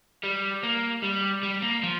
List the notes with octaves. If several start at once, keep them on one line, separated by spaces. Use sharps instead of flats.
G3
A#3
G3
G3
A#3
F3